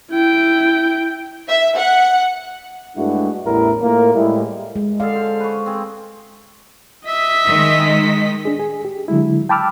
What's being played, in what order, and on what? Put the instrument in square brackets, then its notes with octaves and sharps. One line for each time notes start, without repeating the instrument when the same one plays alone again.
[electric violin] E4 G5
[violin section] E5
F#5
[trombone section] G2 G#3 A3 D4 E4 F#4
A1 E2 A2 G3 E4 A#4
A2 A#3 F4 A#4
A2 G3 G#3 E4
[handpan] G#3
[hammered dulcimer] D3 G#4 A4 [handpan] F5
[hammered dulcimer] C5
B4 C#6
C4 G#4
[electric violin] D#5 B6 [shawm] E5
[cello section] D#3 G#3
[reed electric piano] D4 G#4
G#4
G4
D3 F#3 G#3 E4
G5 A5 B5 D6 E6 F6